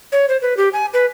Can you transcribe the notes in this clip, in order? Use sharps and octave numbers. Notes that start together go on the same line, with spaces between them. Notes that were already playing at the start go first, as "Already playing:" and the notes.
C#5
C5
B4
G4
G#5
B4